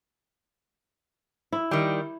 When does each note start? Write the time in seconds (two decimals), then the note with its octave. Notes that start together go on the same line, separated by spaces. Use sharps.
1.53 E4
1.71 D#3 G3